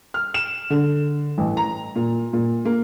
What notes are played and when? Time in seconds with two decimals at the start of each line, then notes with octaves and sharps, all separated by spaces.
0.14 F6
0.34 E7
0.70 D3
1.38 A1
1.57 A#5
1.96 A#2
2.33 A#2
2.65 A#3